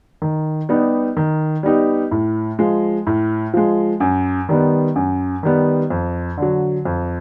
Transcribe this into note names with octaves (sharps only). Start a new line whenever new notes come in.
D#3
G3 B3 D#4 G4
D#3
G3 B3 D#4 G4
A2
F3 G#3
A2
F3 G#3
F#2
D#3 G3 B3
F#2
D#3 G3 B3
F2
D3 F#3
F2